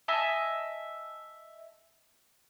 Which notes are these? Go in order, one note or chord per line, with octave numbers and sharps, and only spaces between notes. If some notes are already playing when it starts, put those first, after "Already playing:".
D#5 E5 G#5 A5